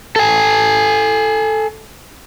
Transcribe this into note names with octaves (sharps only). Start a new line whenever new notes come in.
A4 G#5